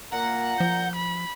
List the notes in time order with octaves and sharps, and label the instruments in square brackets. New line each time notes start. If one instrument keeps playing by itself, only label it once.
[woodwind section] A#2 A#5 [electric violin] A#3 [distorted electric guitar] F#5
[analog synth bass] F3 [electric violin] G6
[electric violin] B5